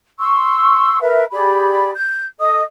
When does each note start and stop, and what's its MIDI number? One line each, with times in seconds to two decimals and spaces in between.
0.18 0.99 84
0.18 0.99 85
0.18 0.99 88
1.01 1.24 70
1.01 1.24 71
1.01 1.24 76
1.32 1.91 67
1.32 1.91 68
1.32 1.91 74
1.32 1.91 83
1.94 2.25 91
2.39 2.62 69
2.39 2.62 75
2.39 2.62 87